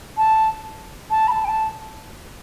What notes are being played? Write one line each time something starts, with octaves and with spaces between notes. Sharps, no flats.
A5
A5
B5
A5
G5
A5